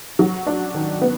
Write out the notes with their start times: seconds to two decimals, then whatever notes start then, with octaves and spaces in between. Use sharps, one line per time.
0.19 F#3
0.46 D4
0.74 D#3
1.01 B3